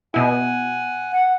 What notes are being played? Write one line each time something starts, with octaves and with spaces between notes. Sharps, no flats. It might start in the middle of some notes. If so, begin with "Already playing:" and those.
B2 E4 F#5 G#5
F#5